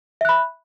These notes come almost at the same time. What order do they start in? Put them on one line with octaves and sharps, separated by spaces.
E5 F#6 B5